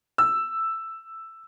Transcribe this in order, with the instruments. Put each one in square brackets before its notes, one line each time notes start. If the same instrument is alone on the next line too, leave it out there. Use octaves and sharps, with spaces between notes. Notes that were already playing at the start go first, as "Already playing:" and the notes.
[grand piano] E6